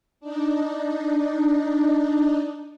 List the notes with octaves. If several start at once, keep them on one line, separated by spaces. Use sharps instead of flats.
D4 D#4